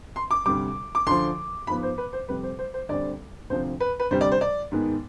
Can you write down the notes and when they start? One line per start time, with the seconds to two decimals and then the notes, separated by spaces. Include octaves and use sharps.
0.16 C6
0.31 D6
0.46 D2 C3 G3 D6
0.95 D6
1.07 D2 D3 F3 C6
1.67 G#2 F3 B3 B5
1.83 C5
1.98 B4
2.13 C5
2.28 F2 C3 G3 B4
2.43 C5
2.59 C5
2.74 C5
2.89 D2 D3 G3 C4 D5
3.50 D2 C3 F3 C4 C5
3.80 B4
4.00 B4
4.11 D2 C3 G3 C5
4.21 D5
4.32 C5
4.41 D5
4.72 G#2 D#3 G#3 B3